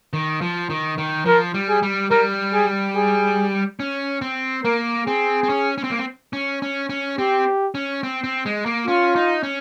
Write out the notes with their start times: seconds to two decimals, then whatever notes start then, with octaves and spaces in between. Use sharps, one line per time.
0.13 D#3
0.41 F3
0.70 D#3
0.98 D#3
1.25 F3 A#4
1.54 G3
1.69 G#4
1.83 G3
2.10 G3 A#4
2.53 G#4
2.95 G#4
3.80 C#4
4.21 C4
4.64 A#3 A#4
5.06 C4 G#4
5.43 C4
5.49 C#4
5.78 C#4
5.84 C4
5.91 A#3
5.98 C4
6.33 C#4
6.62 C#4
6.89 C#4
7.18 C4 G4
7.75 C#4
8.03 C4
8.24 C4
8.45 G#3
8.66 A#3
8.87 C#4 F4
9.16 D#4
9.43 C#4